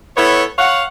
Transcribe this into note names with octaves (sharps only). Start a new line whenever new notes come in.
B3 E4 A4 C#5
C#5 F5 F#5